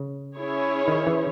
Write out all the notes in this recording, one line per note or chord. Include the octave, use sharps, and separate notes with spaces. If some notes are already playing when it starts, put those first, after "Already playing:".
Already playing: C#3
C#4 E4 G#4 C#5
D#3
E3